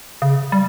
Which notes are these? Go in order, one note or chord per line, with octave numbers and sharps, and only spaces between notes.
C#3
G3